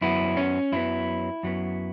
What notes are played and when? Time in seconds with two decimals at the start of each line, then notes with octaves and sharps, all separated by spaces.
0.01 F#2 F#3 B3 E4
0.37 C#4
0.72 F#2 F#3 B3 E4
1.43 F#2 F#3 B3